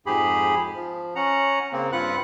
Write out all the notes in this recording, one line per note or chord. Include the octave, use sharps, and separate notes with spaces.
F2 G#2 G4 G#4 B5
F3
C#4 F#5 A#5
C#3 A#3 C4
G2 C4 F4 B4 F#5 F#6